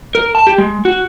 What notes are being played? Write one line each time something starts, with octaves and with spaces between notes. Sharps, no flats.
A#4
A5
G4
G#3
F#4